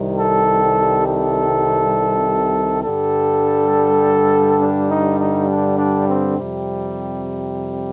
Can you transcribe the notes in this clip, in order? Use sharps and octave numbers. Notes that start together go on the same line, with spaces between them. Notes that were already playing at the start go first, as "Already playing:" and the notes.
Already playing: C2 C3 D#3 G3
A4
A4
G2 D3 G3 A4
D4
D#4
D#4
D4
D4
C4
F2 C3 G3